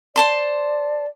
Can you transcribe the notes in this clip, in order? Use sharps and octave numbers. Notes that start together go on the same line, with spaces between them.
C5 D5 A5 C6